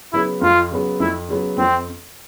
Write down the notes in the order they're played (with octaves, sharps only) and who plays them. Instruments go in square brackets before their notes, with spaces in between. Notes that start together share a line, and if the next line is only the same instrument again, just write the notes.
[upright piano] C#3 F#3 B3 [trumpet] E4
[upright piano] F2 [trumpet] F4
[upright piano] C#3 F#3 B3
[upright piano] F2 [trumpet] E4
[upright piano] C#3 F#3 B3
[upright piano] F2 [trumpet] C4